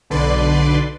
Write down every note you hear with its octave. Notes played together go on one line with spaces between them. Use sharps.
B1 D3 B4 D5 C6